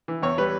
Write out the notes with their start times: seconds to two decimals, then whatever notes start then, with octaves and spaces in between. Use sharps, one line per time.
0.08 E3
0.22 E2 C#5
0.38 G3 B4